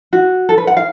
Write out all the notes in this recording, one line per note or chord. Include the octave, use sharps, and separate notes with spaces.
F#4
A4
B4
F#5
F5